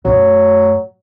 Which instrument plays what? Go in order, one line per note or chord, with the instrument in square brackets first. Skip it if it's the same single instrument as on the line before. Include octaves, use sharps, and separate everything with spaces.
[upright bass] F#2 A3 [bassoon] F#3